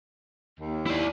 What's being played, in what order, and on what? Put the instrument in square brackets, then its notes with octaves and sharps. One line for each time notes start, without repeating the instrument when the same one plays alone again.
[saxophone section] D#2
[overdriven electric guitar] E4 D5